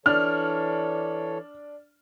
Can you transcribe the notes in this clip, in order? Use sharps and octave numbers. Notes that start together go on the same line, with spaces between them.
E3 D4 A4 C#5 F6